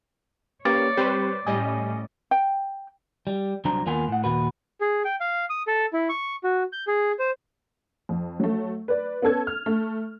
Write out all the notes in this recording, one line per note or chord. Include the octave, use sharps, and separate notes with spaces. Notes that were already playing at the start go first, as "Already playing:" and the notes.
A#3 C#4 G4 B4 C#5 D5
G3 C4 G4 B4 C5
A2 G3 C#4 D#5 G#5
G5
G3
C2 F#3 D4 C5 A#5
D#2 A#3 B3 F4 G#5 C6
A2 F#5
D#2 A#2 F#4 B4
G#4
G5
F5
D#6
A4
E4
C#6
F#4
G6
G#4
C5
F2
F#3 A3
B4 D5
B3 C#4 A4 G#6
F6
A3